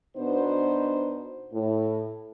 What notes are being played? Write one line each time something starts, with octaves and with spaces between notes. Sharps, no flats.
B2 B3 D4 D#4 C5
A2